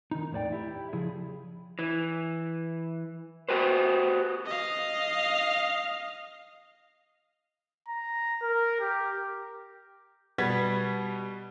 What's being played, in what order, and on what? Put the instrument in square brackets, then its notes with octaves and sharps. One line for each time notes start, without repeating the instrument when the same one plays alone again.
[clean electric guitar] D#3 D#4
E2 A2 C5 D5 G5
E4 G4
C#3 F3 E4 G#4
E3
F#4 G4 B4 C5
[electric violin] D#5 F5
[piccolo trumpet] A#5
A#4
G4
[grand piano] B2 G3 B3 G#6 A6 B6